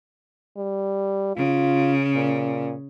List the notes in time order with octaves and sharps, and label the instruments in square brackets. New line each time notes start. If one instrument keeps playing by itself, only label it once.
[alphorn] G3
[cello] C#3 [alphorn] F4
[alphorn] A#2